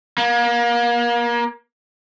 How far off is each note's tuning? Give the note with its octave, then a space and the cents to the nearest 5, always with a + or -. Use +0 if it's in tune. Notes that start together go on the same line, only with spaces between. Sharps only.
A#3 +30